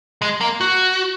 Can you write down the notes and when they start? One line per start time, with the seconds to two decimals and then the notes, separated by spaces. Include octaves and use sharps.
0.22 G#3
0.41 A#3
0.61 F#4